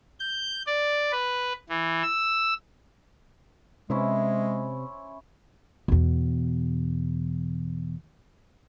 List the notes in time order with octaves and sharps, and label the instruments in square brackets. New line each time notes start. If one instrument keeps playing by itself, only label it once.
[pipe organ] G6
D5
B4
E3
E6
[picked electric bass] C3 [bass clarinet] G#3 [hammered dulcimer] C#4 E4 C5
[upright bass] E2 B2